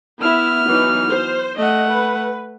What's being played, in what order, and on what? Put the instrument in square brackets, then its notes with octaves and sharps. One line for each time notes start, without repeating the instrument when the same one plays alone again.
[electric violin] B3 F6 [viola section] E4 E5
[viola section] E3 F#3 D#4
C5
[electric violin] A3 F#5 [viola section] D#5
[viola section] B4